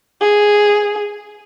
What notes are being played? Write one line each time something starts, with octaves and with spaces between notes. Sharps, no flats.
G#4